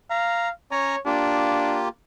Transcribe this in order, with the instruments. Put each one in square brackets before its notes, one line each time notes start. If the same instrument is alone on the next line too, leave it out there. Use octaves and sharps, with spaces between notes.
[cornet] F5 [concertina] A#5
[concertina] C#4 G#5 A#5 [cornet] C#5
[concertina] A#3 F4 G4 [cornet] D4